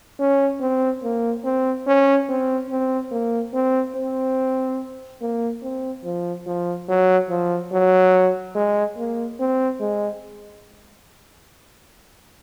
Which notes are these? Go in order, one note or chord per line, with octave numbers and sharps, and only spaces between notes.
C#4
C4
A#3
C4
C#4
C4
C4
A#3
C4
C4
A#3
C4
F3
F3
F#3
F3
F#3
G#3
A#3
C4
G#3